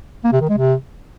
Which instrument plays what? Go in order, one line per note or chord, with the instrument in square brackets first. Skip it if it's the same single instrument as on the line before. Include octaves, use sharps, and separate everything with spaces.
[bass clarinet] A#3
C3
D#3
G#3
C3